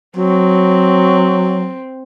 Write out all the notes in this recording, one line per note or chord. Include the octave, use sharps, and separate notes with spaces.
F#3 C4